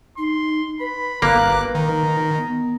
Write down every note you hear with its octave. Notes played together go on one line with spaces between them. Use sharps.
D#4 C6
B4 B5
G1 A#3 A#5 D6 F#6
D#3 A#5
B3